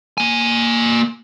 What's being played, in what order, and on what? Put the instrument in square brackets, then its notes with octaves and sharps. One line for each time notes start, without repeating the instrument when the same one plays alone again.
[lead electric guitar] A#3 G#5